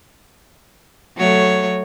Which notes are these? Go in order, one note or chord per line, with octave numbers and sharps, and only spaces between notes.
F#3 A3 C#5